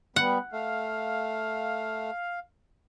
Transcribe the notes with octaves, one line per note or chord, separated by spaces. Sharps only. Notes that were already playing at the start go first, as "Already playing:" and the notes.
G3 B3 F#5
A3 F5